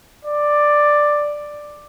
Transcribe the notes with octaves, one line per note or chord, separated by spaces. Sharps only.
D5